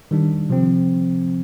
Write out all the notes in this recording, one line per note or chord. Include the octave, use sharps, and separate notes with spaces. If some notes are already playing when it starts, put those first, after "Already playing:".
D#3 G3 D4
C3 F3 C4